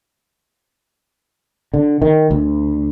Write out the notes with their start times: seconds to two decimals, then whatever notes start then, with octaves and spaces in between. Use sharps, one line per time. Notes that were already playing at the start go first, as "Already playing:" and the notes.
1.74 D3
2.02 D#3
2.31 D2